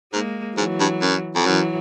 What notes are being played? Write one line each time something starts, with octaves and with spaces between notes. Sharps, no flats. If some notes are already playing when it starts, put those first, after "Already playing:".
G#2 G#3 A#3
G#2 E3 F#3
G2
F#2
F2
F#2 E3 F#3